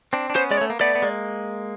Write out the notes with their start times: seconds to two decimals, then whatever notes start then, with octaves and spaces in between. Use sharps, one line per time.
0.13 C4 D4
0.30 D4
0.35 B3 C#4 C5
0.51 G#3 D5
0.57 C#5
0.61 A3
0.70 A#3
0.80 A3 B3 D5
0.95 B3
1.02 G#3 A#3